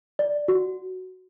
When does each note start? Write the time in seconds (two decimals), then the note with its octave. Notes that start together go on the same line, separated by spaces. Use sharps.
0.19 D5
0.48 F#4